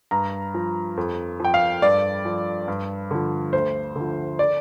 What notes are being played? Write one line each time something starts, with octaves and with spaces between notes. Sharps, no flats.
G2 A#5
F3
F2
F3 G5
F5
G2 D5
F3
G2
D3 F3
D2 C5
D3
F3
D5